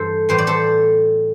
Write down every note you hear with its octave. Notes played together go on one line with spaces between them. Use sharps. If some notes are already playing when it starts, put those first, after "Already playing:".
Already playing: G2 E3 A4 C5
A2 E3 C5
D5
A4 C5